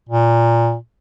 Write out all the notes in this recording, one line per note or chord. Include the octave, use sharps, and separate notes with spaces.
A#2